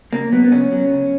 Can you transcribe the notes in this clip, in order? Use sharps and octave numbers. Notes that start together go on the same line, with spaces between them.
C#3 A#3
F#3 B3
B3
C#3 C#4
F#3
C#3